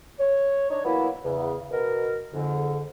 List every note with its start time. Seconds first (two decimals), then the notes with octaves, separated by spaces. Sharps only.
0.19 C#5
0.70 D4 D#4 C#5
0.84 E3 F#3 A#3 B3 E4
1.24 E2 C#3
1.71 B2 A#4
2.33 F2 G#2 D3